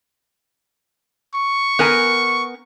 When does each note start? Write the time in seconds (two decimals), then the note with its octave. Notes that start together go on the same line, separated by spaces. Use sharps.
1.35 C#6
1.79 B3 A#4 G#5